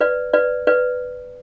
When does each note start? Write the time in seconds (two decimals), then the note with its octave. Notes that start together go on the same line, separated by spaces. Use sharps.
0.01 B4 D5
0.34 B4 D5
0.67 B4 D5